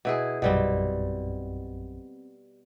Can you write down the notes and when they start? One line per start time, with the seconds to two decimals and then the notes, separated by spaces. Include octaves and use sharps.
0.05 B2 E4 G#4
0.42 A#1 F#2 B2 G3 C4